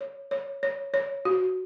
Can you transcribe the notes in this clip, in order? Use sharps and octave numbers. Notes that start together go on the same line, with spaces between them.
C#5
C#5
C#5
C#5
F#4